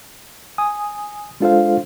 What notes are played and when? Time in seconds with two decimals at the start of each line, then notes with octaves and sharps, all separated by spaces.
0.58 G#5 D#6
1.40 G#3 D4 F4 A4 C5 F5